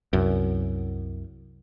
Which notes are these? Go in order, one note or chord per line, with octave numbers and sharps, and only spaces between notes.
C2 F#2